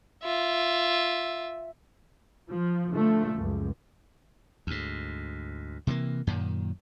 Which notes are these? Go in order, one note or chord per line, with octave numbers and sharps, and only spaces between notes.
F4 E5
F3
D3 F3 A3
C#2 F#2
D2 G#2
C3 E3 A3 A#3
F#2 A#2 D#3